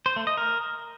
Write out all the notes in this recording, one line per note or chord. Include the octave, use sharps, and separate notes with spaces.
C5
A3
D#5
A#4